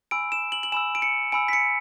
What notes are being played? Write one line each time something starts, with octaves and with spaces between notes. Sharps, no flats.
G#5 B5 E6 D7
E7
F#7
F#7
G#5 B5 E6 E7
D7
C#7
G#5 B5 E6 D7
B6
C#7